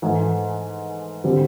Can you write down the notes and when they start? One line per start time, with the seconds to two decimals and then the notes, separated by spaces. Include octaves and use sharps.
0.02 G#2 E3 A3
1.24 D3 G3 C4